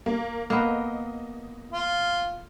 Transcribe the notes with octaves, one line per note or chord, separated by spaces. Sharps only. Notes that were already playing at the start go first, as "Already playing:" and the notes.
A#3
A#3 B3 D#5
F4